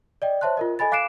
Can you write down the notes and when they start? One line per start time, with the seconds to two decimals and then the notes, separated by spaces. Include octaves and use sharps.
0.22 D5 D#5 G5
0.41 C5 C#5 E5 A5 C6 F#6
0.57 F4 A#4 D#5
0.79 A4 D#5 G#5 B5 A6
0.92 F5 D6 F#6 C7 D7 E7